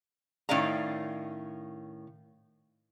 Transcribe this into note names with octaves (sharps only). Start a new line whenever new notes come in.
A2 D#3 C#4 D5 F5 A#5